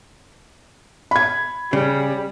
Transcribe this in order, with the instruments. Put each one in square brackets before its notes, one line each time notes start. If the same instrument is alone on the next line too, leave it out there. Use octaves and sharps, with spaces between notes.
[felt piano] B5 G#6
[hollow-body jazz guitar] C#3 [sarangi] G3